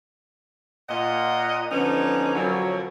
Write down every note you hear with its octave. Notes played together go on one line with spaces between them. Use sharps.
A#2 D#5 F#5
D3 E3 F3 B3 C#4 D#4
F#2 B2 D3 F3 F#3